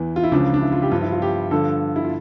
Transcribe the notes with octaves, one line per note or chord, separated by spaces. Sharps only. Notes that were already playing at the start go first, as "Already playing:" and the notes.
Already playing: E2 E3 E4
F4
E4
C#2 C#3 F3 D4
D4
E4
F4
G4
G2 F3 F4
E4
F4
G4
G2 D3 F3 A4
E4
F4